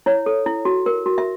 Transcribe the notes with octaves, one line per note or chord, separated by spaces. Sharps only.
E4 C#5
A4
E4
F#4
A#4
F#4
E5